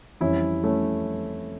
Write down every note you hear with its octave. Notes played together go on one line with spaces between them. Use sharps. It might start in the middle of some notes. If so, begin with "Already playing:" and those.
F2 E3 G3 C#4 E4
A3 C#4